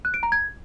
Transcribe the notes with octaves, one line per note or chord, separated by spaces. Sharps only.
F#6
D7
A#5
G#6